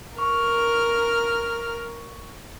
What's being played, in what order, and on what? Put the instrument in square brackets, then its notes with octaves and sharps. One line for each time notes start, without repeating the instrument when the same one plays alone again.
[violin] A#4 F6 [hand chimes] C#6